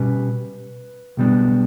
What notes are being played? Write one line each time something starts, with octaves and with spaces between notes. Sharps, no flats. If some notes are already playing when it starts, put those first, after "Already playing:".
Already playing: B2 G3 C#4 B4
B1 B2 G3 B3 D4